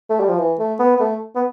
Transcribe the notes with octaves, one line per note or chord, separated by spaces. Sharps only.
A3
G3
F3
E3
A3
B3
B3
A3
B3